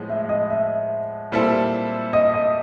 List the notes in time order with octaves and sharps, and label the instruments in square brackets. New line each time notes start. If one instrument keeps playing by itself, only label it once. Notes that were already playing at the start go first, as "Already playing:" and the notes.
Already playing: [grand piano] A2 F3 G#3 B3
[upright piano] E5
D#5
E5
[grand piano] A#2 G3 C4 E4 A4
[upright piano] D#5
D#5